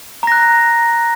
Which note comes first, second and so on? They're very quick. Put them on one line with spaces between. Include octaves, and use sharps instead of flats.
A#5 A#6 F#6